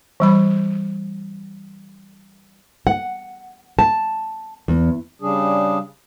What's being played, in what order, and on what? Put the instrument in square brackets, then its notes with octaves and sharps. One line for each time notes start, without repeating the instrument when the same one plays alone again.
[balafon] E3 G3 B5
[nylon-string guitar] F#5
A5
E2
[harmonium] C#3 G3 D4 G#4